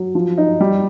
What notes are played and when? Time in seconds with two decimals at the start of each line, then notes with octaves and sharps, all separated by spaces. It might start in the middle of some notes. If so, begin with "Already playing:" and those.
Already playing: F#3
0.15 F3
0.38 D#4
0.61 G3